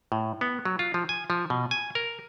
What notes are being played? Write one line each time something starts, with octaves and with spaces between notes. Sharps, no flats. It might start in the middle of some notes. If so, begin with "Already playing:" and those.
A2
B3
F#3
F4
F3
G#5
F3
B2
G#5
A#4